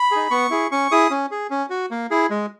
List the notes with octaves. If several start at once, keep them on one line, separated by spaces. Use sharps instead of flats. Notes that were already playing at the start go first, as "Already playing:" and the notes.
Already playing: B5
D#4 G#4
B3 C#6
E4 G#4
C#4 C#6
E4 G#4 D#6
C#4
G#4
C#4
F#4
A#3
E4 G#4
G#3